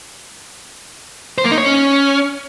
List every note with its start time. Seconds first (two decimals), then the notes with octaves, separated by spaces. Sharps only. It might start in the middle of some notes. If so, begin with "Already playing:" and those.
1.38 C5
1.45 A#3
1.51 D#4
1.58 C#5
1.64 C#4